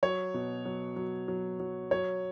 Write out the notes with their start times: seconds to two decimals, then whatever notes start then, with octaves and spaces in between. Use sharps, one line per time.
0.03 F#3 C#5
0.34 B2
0.65 F#3
0.96 F#3
1.28 F#3
1.60 F#3
1.91 F#3 C#5